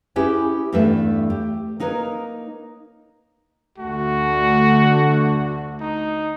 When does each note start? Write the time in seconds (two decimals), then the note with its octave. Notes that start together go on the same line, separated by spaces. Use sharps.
0.16 C#4 E4 G4 G#4 B4 C#5
0.73 E2 G2 G3 A3 B4 E5
1.30 G4
1.80 A#3 D#4 A#4 B4 C#5
3.78 D2 D3 A3 F#4
5.81 D#4